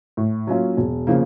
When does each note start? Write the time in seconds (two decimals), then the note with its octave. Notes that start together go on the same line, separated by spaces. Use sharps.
0.17 A2
0.47 F#3 A#3 C#4 F4
0.77 E1
1.07 C#3 F3 A#3